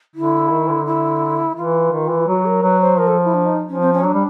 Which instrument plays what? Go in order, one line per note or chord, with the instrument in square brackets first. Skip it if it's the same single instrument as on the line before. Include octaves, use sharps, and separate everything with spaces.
[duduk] D3 [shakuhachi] E4
[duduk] D#3
D3
[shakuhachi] E4
[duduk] E3 [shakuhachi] F4
[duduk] D#3
E3
[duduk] F#3 [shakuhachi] F#4
[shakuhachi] A#4
[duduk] F#3 [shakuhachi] B4
[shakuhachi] C5
[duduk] F3 [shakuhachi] A#4
[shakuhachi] A4
E4
D4
D#4
[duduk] F3 [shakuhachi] C#4
[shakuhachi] C4
C#4
[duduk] F#3 [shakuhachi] D4
[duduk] G3